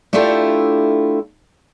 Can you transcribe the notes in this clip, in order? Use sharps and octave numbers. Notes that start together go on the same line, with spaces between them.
A3 D4 E4 F4 G4 A4